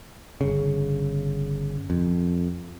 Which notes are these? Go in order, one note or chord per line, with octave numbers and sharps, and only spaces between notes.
G1 C#3
F2